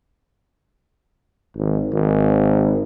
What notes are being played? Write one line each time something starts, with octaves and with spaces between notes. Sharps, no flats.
G#1
G#1